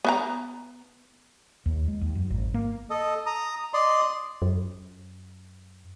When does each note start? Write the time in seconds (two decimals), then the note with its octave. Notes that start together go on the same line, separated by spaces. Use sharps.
0.04 B3 E5 A#5
1.66 D#2
1.88 G#3
2.01 D#2
2.15 F#2
2.30 G#1
2.54 A#3
2.90 A4 D#5
3.26 A#5 D#6
3.73 D5 D#5 C6
4.42 F#2